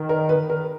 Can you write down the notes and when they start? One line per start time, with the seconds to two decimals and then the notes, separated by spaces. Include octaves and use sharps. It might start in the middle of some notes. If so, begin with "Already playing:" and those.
Already playing: D#3
0.09 A#4
0.29 B4
0.50 A#4